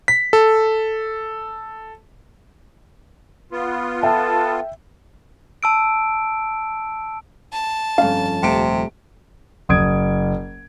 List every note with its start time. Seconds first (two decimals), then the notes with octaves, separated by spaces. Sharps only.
0.08 B6
0.33 A4
3.52 B3 F4
4.03 A4 E5 G5 A5
5.63 A5 E6 D7
7.53 A5
7.98 G1 F2 C#4 F5
8.43 D#1 C3 A3 D7
9.69 F#1 D#6 G#6 D7